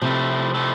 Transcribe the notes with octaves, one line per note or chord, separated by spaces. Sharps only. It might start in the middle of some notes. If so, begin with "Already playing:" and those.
C3 F3 A3 E4
F3 A3 E4